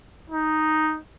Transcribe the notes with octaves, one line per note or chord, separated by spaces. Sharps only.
D#4